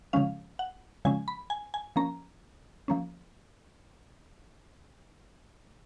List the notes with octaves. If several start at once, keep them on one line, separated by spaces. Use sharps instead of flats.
C#3 F3 G#3 C#4 F5
F#5
C#3 F3 G#3 C#4 G#5
B5
G#5
G#5
F3 A#3 C#4 A#5
F3 A#3 C#4